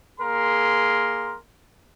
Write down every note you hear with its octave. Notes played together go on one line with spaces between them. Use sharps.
A#3 G#4 A#4 C6